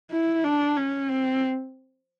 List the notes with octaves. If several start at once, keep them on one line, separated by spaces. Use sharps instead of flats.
E4
D4
C#4
C4